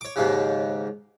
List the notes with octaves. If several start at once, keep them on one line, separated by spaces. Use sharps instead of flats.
C#5 D6
D#2 G#2 C#3